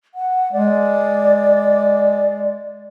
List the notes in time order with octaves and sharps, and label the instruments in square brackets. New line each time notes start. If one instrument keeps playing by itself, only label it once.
[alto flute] F#5
[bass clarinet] G#3 [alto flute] D5